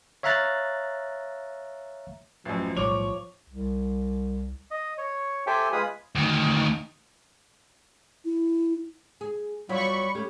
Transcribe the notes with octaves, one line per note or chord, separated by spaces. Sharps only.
C#5 E5 F5 A#5 F#6 A6
A1 F#2 F3
B1 A2 G3 C#5 C#6 D6 F7
C2
D#5
C#5
G4 A4 C5 E5 G5 G#5
G#3 F4 G#4 B4 B5 D#6
D2 D#3
E4
G#4
E2 F#3 G3 F4 B5 C#6
G3 A3 C#4